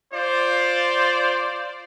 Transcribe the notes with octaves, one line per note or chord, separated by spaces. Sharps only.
F4 C5 D5